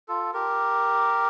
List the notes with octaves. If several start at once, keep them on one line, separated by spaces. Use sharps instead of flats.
F4 A4
G4 A#4